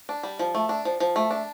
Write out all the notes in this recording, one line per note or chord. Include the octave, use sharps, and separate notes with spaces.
D4
G3
F3
A3
D4
F3
F3
A3
D4